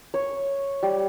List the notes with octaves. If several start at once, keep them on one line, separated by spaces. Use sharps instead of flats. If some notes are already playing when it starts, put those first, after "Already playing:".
C#5
G3